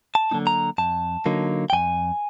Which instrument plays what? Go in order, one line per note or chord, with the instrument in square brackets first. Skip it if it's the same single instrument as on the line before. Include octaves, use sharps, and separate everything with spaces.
[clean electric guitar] A5
D3 F#3 A#3 D#4
A#5
F2 A5
D3 F#3 A#3 D#4
G5
F2 G#5